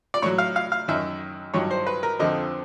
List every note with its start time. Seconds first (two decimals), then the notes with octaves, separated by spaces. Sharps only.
0.14 D5
0.22 A2 F#3 C#5
0.38 F5
0.56 F5
0.72 F5
0.88 F#2 D#3 F#3 E5
1.54 G2 D#3 F#3 C#5
1.71 C5
1.87 B4
2.03 A#4
2.19 F2 D3 F3 D#5